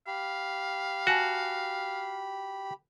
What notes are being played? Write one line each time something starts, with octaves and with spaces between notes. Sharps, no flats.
G4 F5 B5
F#4 F#5 G#5 A5